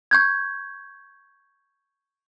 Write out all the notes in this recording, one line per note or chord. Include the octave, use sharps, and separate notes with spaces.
C#6 G6 G#6